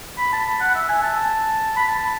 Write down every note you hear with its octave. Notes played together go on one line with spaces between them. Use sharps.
B5
A5
F#5
E5
G#5
A5
B5
A5